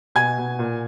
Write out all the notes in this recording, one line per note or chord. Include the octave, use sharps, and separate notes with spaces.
B2 G#5 G#6
B2
A#2